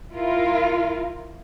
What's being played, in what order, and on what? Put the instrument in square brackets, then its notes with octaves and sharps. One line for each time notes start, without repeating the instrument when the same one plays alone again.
[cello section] E4 F4 A#4